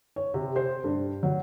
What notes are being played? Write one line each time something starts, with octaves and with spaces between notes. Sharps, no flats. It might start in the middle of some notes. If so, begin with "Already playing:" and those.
C#5
C3
C5
G2
F#3